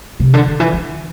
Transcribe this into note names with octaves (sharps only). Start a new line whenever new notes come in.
C3
D3
D3
E3
E3